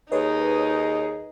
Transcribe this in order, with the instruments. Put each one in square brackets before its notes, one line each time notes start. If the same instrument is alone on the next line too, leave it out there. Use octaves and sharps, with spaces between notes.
[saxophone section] D#2 G#4 [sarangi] D#4 [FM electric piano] B4 C#5 D#5